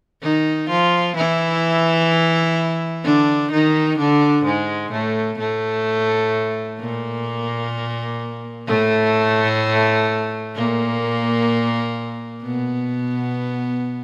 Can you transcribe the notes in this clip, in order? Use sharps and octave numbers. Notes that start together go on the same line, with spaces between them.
D#3 D#4
F3 F4
E3 E4
D3 D4
D#3 D#4
D3 D4
G#2 G#3
A2 A3
A2 A3
A#2 A#3
A2 A3
A#2 A#3
B2 B3